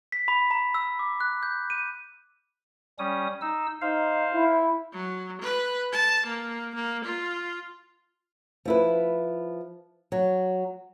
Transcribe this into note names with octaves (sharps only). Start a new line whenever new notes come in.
B6
B5
A#5
E6
D6
F#6
G6
D#7
G3 C#4 D#6
D#4 E6
D#4 C5 F5
E4
F#3
B4
A5
A#3
A#3
F4
F3 E4 B4
F#3